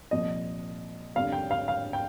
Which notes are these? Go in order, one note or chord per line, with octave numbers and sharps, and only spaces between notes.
C2 A#2 F3 D#5
F2 D3 G3 F5
G5
F5
F5
G5